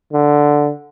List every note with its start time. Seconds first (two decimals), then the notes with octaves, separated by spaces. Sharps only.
0.13 D3